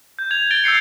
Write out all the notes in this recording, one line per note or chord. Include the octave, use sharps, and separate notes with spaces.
G6
G#6 F7
A6 D7 G7
E6 G6 C7 C#7